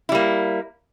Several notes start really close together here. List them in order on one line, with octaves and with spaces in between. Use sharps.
E4 G3 A#3